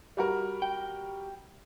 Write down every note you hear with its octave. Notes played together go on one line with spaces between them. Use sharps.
G3 F#4 A#4
G5